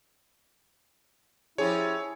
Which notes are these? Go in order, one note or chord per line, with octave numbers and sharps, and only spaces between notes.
F3 C#4 E4 G4 G#4 C#5